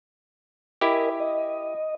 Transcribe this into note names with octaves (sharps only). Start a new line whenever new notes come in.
E4 G4 A#4 D#5 G#5
D#5